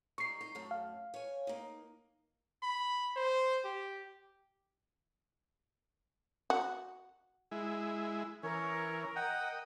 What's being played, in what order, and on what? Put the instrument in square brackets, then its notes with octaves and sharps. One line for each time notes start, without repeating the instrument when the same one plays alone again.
[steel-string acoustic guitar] G3 D#4 [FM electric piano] C#6 C7
[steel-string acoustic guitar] D#4
F#2 A3
[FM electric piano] F5
[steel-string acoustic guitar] C#5 G#5
A#3 D#4
[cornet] B5
C5
G4
[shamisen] F#4
[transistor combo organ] G#3 E4
[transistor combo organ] E3 [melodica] C#4 C#5 [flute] A#4
[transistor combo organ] D#5 [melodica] F#5 G5